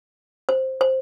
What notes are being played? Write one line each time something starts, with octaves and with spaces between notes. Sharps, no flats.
C5
C5